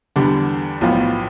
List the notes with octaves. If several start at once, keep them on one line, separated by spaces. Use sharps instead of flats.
E2 D3 G3 B3 D4
B1 A2 F3 B3 F4